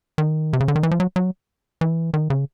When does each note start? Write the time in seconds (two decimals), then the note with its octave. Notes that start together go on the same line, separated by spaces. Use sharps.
0.18 D#3
0.53 C3
0.60 C#3
0.68 D3
0.76 D#3
0.83 E3
0.91 F3
1.00 F#3
1.16 F#3
1.81 E3
2.14 D#3
2.30 C#3